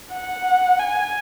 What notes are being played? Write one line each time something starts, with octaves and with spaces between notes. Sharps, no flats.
F#5
G#5